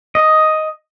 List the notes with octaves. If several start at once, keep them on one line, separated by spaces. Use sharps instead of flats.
D#5